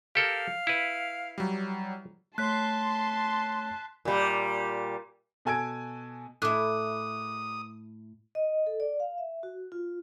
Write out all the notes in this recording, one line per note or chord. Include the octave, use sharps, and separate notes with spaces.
G4 A4 A#4 F5
E4 B4
F#3 G3
A3 C#5 A5 C6 F#6 B6
A#2 G3
B2 A4 G#5 E6 G#6 D7
A2 E4 D6 D#6 F#6
D#5
A4
D5
F5
E5
F#4
F4